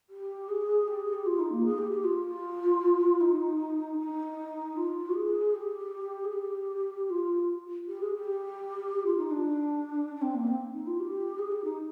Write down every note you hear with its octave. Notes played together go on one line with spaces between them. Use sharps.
G4
G#4
G4
G#4
G4
F4
D#4
A#3
G#4
G4
G4
F4
D#4
D#4
F4
G#4
G4
G#4
G4
F4
G4
G#4
G4
F4
D#4
D4
D4
C4
A#3
C4
D#4
F4
G4
G#4
G4
D#4